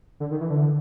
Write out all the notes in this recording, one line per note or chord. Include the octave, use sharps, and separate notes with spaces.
D3
D#3
E3
D3